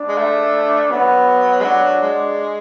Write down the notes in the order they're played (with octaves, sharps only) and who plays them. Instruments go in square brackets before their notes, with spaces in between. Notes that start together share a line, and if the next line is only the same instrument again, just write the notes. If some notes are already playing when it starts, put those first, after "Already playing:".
Already playing: [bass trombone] D4
[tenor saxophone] G#3
A3
[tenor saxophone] F#3 [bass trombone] B3
[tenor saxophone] G#3
[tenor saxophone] F#3 [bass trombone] D4
[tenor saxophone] G#3